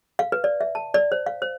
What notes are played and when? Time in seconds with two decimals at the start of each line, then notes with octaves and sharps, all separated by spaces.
0.19 F5
0.32 B4
0.44 D5
0.61 E5
0.75 A5
0.94 D5
1.12 C5
1.26 F5
1.42 C5